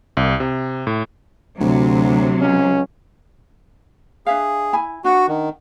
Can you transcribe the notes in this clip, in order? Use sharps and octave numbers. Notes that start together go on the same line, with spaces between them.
C2
C3
A2
D2 C3 F#3
C#2 C#4
D4 G#4 E5 F5
E4 G#5 B5
D4 F#4 F#5
D#3